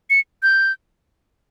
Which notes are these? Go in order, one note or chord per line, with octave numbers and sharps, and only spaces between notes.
C#7
G6